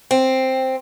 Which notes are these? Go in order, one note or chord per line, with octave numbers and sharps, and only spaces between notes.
C4